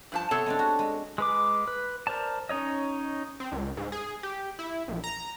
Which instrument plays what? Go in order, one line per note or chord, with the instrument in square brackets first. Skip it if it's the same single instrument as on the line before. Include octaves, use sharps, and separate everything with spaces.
[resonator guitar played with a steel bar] G2 F3 A5
[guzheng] C3 [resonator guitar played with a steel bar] B3 A4 C#5
[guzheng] G#3 C4 D4
F#4
G#3
[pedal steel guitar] G#3 B4 D6
B4
A#4 C5 D5 A5
C#4 D#4 C#5 D#5
[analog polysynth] C4
C#2
G#2
G#4
G4
E4
A#1
A#5